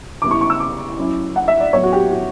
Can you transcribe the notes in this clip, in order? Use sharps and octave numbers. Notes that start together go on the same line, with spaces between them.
C#3 G3 B3 E4 D6
C#6
C#6
E6
D6
F#3 C#4 E4
F#5
E5
D5
A2 F#3 B3 E4 C#5
F#4
G4
F#4